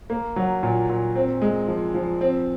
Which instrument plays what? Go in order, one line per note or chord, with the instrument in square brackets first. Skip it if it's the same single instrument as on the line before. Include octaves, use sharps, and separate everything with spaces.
[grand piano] A#3
F#3
A#2
A#2
C4
G#3
F3
F3
C4